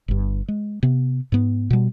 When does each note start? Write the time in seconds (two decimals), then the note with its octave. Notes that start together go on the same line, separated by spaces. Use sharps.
0.08 G1 G2
0.48 G#3
0.83 C3 B3
1.32 G#2 B3
1.70 B2 G3